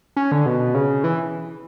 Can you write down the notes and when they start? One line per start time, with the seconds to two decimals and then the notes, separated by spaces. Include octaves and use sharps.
0.16 C#4
0.32 D3
0.46 B2
0.74 C#3
1.04 E3